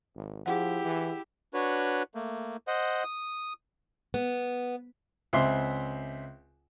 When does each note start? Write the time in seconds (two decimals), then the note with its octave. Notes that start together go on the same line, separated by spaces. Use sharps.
0.16 G#1
0.46 F3 E4 G4 G#4 F#5
0.84 E3
1.54 D4 F#4 B4 C#5
2.15 A3 A#3
2.68 C5 D#5 F#5
3.04 D#6
4.14 B3
5.33 C#2 C4 E5 C6